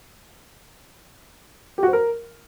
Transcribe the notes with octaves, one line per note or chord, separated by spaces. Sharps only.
G4
F#4
C5
A#4